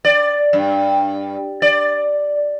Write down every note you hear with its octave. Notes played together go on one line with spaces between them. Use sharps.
D5
G2
D5